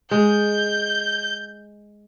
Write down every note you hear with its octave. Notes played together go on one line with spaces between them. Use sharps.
G#3 G6